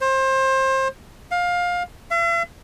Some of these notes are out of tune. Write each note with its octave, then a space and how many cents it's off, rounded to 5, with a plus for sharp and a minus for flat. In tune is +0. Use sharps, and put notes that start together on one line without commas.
C5 +25
F5 +20
E5 +45